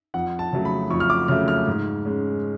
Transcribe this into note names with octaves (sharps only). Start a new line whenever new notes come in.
F2 F#5
A5
C#3 F#3 A3
B5
F2 C#6
F6
D6
C#3 F#3 A3 F6
F6
G#2
G#3 C#4